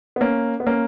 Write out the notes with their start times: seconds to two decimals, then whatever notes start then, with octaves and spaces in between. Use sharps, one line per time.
0.16 B3
0.21 A#3 C#4
0.60 B3
0.66 A#3 C#4